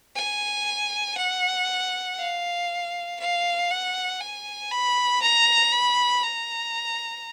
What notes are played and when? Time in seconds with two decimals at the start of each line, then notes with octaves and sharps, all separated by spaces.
0.16 G#5
1.18 F#5
2.19 F5
3.20 F5
3.71 F#5
4.21 G#5
4.71 B5
5.22 A#5
5.73 B5
6.23 A#5